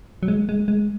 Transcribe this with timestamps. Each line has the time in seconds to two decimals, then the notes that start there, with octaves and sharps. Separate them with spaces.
0.23 F#3
0.28 G#3
0.49 G#3
0.68 G#3